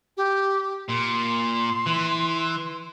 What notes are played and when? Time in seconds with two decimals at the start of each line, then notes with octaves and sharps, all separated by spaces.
0.17 G4
0.88 A#2 C6
1.86 E3